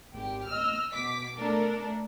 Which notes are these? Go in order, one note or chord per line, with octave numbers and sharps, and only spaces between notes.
G#1 G4
D#5 E6 F6
B2 D6 B6
A3 D4 A4 A#4